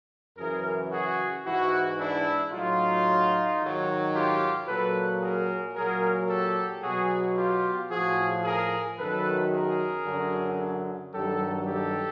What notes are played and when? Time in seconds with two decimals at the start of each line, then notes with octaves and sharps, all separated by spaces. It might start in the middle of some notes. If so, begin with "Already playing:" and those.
0.37 F#2 C#3 E3 G#4 A#4
0.92 F#4 G#4
1.45 G#2 E3 E4 F#4
1.99 D4 E4
2.52 A2 F#3 D#4 F4
3.60 G#2 D#3 F#3
4.14 F4 G4
4.68 A#2 F#3 A4 B4
5.22 G#4 A#4
5.76 A#2 F#3 G#4 A#4
6.29 G4 A4
6.83 B2 F#3 F#4 G#4
7.37 F4 G4
7.91 A2 F3 F#4 G#4
8.44 G#4 A#4
8.98 F#2 D#3 F#3 A4 B4
9.52 G#4 A#4
10.06 F#2 D3 F#3
11.13 G2 D#3 F#3 G4 A4
11.66 G4 A4